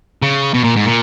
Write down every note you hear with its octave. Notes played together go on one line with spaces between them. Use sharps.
C#3
B2
A#2
G#2
A#2